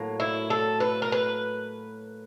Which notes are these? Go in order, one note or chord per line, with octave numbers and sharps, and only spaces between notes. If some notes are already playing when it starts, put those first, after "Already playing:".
Already playing: A2 F#3 A#3
E4
A4
B4
A#4
B4